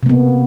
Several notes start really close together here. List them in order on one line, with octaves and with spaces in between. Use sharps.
C3 A#3 B3